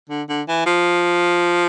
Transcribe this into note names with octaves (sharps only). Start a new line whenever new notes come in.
D3
D3
E3
F3